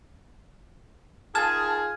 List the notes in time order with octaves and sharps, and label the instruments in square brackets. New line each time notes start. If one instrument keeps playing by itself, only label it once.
[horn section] D#3 F4 G#4 [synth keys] A5 [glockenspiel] F6 G#6